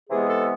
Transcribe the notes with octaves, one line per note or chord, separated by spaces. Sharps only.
C3 E3 G#3 B3 G#4
A4